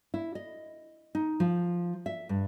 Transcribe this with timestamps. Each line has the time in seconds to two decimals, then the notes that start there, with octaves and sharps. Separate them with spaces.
0.14 E4
0.35 D#5
1.15 D#4
1.40 F3
2.06 E5
2.29 G2